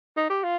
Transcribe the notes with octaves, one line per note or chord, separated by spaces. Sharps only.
D#4
G4
F4